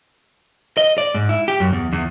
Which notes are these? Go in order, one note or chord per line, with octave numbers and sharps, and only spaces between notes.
D#5
D5
G#2
E4
G4
F#2
E2
E2